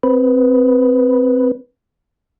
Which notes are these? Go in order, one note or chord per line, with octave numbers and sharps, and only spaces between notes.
C4 B4